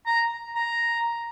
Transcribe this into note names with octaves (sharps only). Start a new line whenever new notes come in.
A#5
A#5